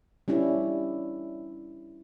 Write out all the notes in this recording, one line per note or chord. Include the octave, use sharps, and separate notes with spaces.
G3 C#4 D4 E4